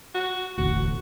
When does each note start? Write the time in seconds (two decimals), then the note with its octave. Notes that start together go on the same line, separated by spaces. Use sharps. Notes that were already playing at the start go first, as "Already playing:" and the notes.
0.15 F#4
0.58 E1 A1 D2 F#4